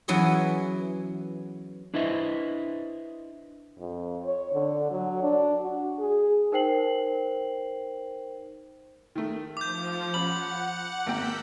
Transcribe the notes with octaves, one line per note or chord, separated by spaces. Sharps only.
E3 F#3 B3 C#4 G#4
D4 E4 B4 C5 D#5 E5
F2
C#5
D3
F#3
D4
F#4
G#4
D#4 A#4 C5 G5 C7 F#7
D#3 A3
F3 D6 G6
C#4 F#5 B5 F#7
G#1 A#3 G5 E6 G6 B6